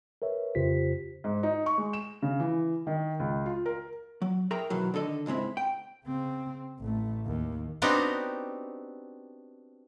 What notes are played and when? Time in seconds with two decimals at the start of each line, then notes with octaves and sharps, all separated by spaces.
0.22 A#4 B4 C#5 E5
0.55 F2 C#3 F4 G4 C5 B6
1.24 G#2
1.43 D#4
1.66 C#6
1.78 G#3
1.93 E7
2.22 C#3
2.40 E3
2.87 D#3
3.20 C#2
3.46 F4
3.66 A#4
4.22 F#3
4.51 G#4 A#4 E5 G5 A#5
4.70 B2 D#3 E3 F#3
4.94 D3 D#3 A4 D#5
5.26 C#2 G#2 G#3 C4 E4
5.57 G5
6.05 C#3 C4
6.80 A1 A3
7.25 D#2
7.82 B3 C4 D4 D#4 F#4 G4